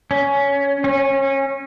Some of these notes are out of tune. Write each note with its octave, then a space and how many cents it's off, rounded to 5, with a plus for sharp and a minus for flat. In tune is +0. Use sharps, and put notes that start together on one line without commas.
C#4 +15
C#4 -25